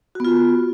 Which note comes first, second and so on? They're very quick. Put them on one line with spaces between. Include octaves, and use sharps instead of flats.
F#4 B3 F4